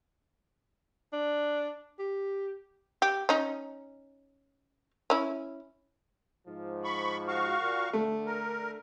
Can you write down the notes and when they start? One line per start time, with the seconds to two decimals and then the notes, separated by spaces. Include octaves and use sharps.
1.12 D4
1.99 G4
3.02 G4
3.29 C#4 D#4
5.10 C#4 E4
6.47 G#2 F3
6.84 B5 C#6
7.28 F#4 F5 C#6
7.60 A#2
7.93 D3 A3
8.26 A#4